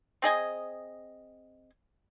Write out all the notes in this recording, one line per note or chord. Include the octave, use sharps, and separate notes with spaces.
C4 G#4 D#5 G#5